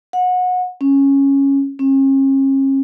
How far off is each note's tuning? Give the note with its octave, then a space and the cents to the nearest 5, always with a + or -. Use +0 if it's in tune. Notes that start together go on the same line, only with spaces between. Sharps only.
F#5 -25
C#4 -5
C#4 -40